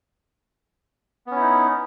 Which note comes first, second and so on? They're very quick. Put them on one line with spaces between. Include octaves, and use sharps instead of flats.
B3 C#4 E4 D#4